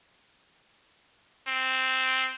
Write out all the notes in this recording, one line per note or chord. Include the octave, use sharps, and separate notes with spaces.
C4